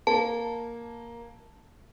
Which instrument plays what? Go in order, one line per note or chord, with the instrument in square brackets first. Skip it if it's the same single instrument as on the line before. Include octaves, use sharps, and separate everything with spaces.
[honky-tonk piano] A#3 [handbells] A5